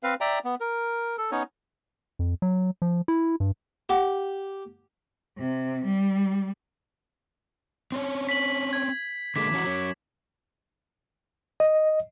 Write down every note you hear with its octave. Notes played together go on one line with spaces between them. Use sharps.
C4 B4 F5
D5 E5 G5 A#5
B3
A#4
A4
B3 C#4 D#4 C#5
F2
F#3
F3
E4
G2
G4 F#5
C3
G3
C4 C#4 C#5
B6 F#7
G#6
D3 G#3 A#3 D6 B6
E3 C#4 F#4
F#3 C#4
D#5